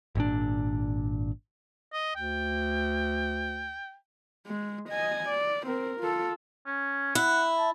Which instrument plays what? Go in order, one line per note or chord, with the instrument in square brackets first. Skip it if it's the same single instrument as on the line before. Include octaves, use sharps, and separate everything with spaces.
[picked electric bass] G#1 A#2 D4
[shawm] D#5
[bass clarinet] D2 [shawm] G5
[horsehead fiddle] G#3
D#5 G#5
D5
C4 A#4
F4 A4
[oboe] C#4
[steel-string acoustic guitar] E4 [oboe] F#5
[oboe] A5